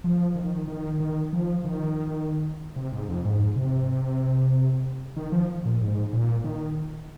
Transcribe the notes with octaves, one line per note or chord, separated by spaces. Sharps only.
F3
D#3
D#3
D#3
F3
D#3
C3
G#2
F2
G#2
C3
D#3
F3
A#2
G#2
A#2
D#3